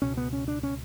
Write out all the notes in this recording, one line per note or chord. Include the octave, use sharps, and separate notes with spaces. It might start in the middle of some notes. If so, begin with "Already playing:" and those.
C#2 B2 C#4
B3
C#4
D4
C#4